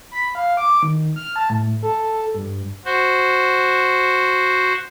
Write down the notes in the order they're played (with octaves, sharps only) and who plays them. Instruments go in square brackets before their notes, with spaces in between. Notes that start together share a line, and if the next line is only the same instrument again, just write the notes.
[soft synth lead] B5
F5
D6
D#3
F6
A5
A2
A4
G2
[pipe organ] F#4 C5